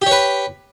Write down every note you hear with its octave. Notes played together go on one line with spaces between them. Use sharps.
G4 B4 C#5